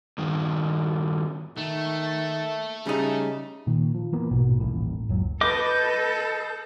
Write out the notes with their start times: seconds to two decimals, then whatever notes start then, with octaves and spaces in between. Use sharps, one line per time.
0.18 G2 D#3
1.57 D#3 A3
2.86 C#3 G3 D#4
3.67 A#2 D#3
3.95 F3
4.13 E3 A#3 B3
4.31 A#1 G#2 B2
4.60 D#1 A1 A2
5.09 F#1 C#2 F#3
5.41 A4 B4 D#5 D6 G6